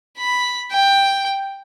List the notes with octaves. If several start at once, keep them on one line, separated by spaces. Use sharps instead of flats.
B5
G5